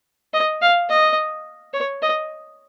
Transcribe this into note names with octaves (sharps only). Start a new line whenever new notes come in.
D#5
F5
D#5
C#5
D#5